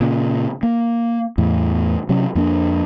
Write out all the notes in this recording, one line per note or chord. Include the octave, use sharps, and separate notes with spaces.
A#2 C#3
A#3
E2 A2
C3 F#3 C#4
F2 A#3 D4